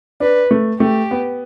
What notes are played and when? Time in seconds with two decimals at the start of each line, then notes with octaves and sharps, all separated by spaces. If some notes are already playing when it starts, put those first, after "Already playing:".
0.20 D4 B4
0.51 A3
0.80 A3 G4
1.11 B3